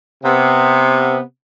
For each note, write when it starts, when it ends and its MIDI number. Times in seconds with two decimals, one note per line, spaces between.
0.24 1.19 48
0.24 1.19 59